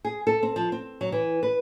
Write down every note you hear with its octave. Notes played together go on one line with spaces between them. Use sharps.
G#4
A4
C4
F3
C4
F#3
E3
B4